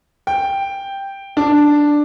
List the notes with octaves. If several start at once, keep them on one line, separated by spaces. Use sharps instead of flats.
G5
D4